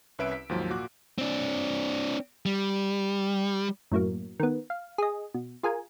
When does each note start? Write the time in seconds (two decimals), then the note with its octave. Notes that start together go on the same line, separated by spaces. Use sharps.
0.19 C2 C#4 B4 E5 E6 D7
0.32 B6
0.49 D#2 G#2 F3 F#3
0.70 A#2 F#4 D6 F#6
1.18 C4 D4
2.46 G3
3.91 F#2 A2 F#3 A#3
4.40 D#3 B3
4.70 F5
4.98 G#4 D#5
5.34 B2
5.63 F4 G#4 A#4 G#5